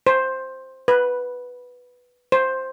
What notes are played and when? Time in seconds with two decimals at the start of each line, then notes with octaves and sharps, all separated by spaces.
0.07 C5
0.88 B4
2.32 C5